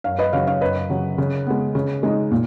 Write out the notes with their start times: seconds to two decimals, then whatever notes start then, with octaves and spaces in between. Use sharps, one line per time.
0.04 F#2 C#5 F5
0.19 B4 D#5
0.33 C#3 F#3 C#5 F5
0.47 C#5 F5
0.61 F#2 B4 D#5
0.90 C#3 F#3
1.18 C#3
1.47 G#3 B3
1.75 C#3
2.03 G#3 D#4
2.31 A#2